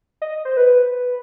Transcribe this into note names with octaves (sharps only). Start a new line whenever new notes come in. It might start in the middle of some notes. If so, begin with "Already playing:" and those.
D#5
C5
B4